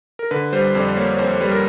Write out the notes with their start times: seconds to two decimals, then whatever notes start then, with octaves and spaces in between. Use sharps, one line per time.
0.19 A#4
0.31 D3 B4
0.52 G3 C5
0.75 F2 D5
0.97 A#3 C#5
1.14 C#5
1.19 F2 C5
1.41 G3 B4
1.51 A#4